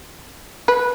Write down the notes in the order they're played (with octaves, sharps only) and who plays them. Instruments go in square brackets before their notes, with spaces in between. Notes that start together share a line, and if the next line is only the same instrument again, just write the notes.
[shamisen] B4